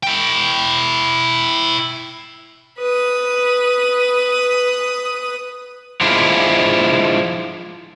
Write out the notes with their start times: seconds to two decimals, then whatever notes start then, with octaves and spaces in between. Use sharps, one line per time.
0.03 E4 G5
2.79 B4 D#6
6.01 F3 G#3 D4 E4 F4